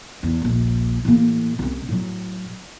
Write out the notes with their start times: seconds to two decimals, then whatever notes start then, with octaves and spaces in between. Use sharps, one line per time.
0.23 E2
0.42 D#1 A#1
1.05 A1 A#3
1.59 C2 C#4
1.89 A2 F#3